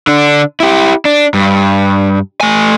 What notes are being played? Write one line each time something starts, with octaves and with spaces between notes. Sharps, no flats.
D3 D4
E4 G4
D4
G2
A3 G#5